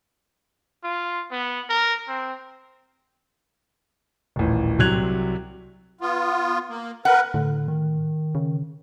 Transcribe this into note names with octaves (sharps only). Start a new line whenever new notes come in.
F4
B3
A#4
C4
D#1 A1
C2 C3 F#3 F#6 G#6 F7
B3 F4
A#3
A#4 B4 F#5
A2 D3
D#3
C#3